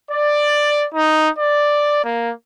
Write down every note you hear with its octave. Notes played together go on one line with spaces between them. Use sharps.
D5
D#4
D5
A#3